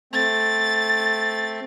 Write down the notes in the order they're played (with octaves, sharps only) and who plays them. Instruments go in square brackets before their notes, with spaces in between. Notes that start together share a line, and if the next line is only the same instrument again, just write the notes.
[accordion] A3 C4 [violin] A6